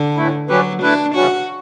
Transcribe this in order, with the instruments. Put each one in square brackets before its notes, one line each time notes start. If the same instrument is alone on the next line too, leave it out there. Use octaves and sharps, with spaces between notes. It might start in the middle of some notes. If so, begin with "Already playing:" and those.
Already playing: [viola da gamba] D3
[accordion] A2 E3 A3 E4
[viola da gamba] F#3 [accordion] G3 C#4 G4 B4
[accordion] A3 E4 B4 [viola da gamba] D4
[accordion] C#3 E3 G3 C#4 [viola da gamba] F#4